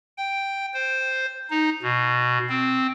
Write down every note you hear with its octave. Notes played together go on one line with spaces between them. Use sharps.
G5
C5
D#4
B2
C4